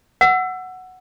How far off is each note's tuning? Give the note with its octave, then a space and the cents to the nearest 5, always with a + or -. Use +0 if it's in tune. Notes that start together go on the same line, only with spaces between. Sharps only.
F#5 +0 E6 +20